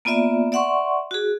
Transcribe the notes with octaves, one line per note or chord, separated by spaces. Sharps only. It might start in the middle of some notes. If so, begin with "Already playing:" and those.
A#3 B3 F4 D5 E5
D5 E5 F#5 C6 C#6
F#4 G#4